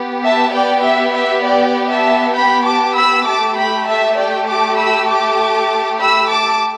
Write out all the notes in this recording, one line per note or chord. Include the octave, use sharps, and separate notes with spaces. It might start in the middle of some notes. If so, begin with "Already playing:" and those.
Already playing: B3 G4
E5 A5
D5 G5
E5
E5
D5 G5
E5 A5
G5 B5
A5 D6
B5 E6
A3 G4 A5 D6
G5 B5
E5 A5
D5 G5
A5 D6
B5 E6
A5 D6
B5 E6
A5 D6